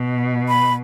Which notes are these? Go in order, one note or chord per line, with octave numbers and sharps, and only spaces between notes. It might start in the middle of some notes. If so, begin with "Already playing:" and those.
Already playing: B2
B5